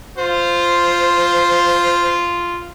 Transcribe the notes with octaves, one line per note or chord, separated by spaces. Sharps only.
F4 C5